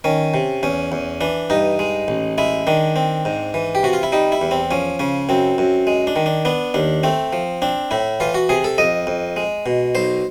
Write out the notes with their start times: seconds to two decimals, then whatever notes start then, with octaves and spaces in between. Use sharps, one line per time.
0.04 D#3 C#4
0.34 C3
0.63 E2 C#4
0.92 E2
1.21 E3 D4
1.50 G2 D#4
1.79 G#3
2.08 A1
2.38 G#3 E4
2.67 D#3 D4
2.96 C4
3.25 G#2
3.54 E3
3.75 G4
3.83 C3 F#4
3.93 F4
4.03 E4
4.12 G3 D#4
4.32 E4
4.41 E2
4.51 C4
4.71 F3 C#4
4.99 C#3 C#4
5.29 F#2 C4
5.58 F#2
5.87 G#3
6.07 D4
6.16 D#3
6.26 D4
6.45 B3 D4
6.74 D#2 D4
7.03 A3 C4
7.33 F3
7.62 C4 D4
7.91 A2 E4
8.20 E3 F4
8.34 F#4
8.49 C3 G#4
8.64 A4
8.78 F2 D#5
9.07 F2
9.36 G#3
9.66 B2
9.95 B1 C5